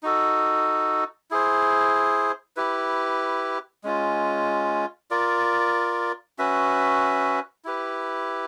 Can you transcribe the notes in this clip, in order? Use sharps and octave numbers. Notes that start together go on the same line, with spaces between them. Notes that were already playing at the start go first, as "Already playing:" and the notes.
D#4 F#4 A4
E4 G#4 C5
E4 G4 B4
G#3 C#4 F4
F4 A#4 D5
C#4 F#4 B4 E5
E4 G4 B4